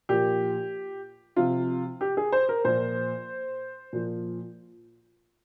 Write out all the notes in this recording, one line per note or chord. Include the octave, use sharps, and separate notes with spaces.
A#2 F3 G4
C3 F3 F4
G4
G#4
C5
A#4
A#2 F3 C5
A#2 F3